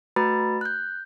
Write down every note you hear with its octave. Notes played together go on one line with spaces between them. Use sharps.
A3 F#4 B4 A#5 B5 A6
F#6 G6